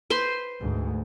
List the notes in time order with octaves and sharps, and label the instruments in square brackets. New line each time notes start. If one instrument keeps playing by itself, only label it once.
[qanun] B4 C5 C6
[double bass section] D2 G#2